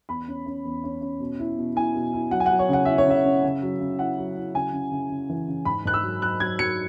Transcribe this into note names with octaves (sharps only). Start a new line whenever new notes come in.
E2 B5
C#4
C#4
E2
C#4
C#4
B2
E4
B2
E4 G#5
B2
E4
F#3 F#5
G#5
F#5
F#3
C#5
C#3 F#5
E4 E5
C#5
C#3 E5
C#4
C#3
F#3
C#3
E4 F#5
F#3
E4
C#3 G#5
C#3
C#3
C#3
E3
C#3
G#2 B5
G#2 F#6
E6
F#3
F#3 F#6
F#3 G#6
F#3 C#7